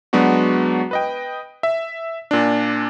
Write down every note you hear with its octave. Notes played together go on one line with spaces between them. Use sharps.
F#3 G#3 B3 D4 F#4
B4 D#5 G5
E5
A#2 D4